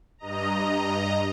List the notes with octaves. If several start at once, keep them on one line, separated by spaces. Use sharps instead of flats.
G2 D#5 A#5